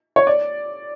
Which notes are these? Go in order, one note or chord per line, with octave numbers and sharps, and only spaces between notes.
C#5
D5